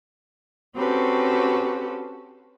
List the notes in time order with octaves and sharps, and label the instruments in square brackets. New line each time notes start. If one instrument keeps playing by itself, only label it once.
[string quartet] C4 C#4 F#4 G4 A4 B4